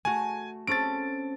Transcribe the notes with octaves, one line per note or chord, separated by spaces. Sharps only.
A3 F#4 G#5
C4 C#4 A4 A6 D7